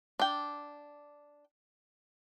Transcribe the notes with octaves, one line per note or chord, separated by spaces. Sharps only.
D4 G5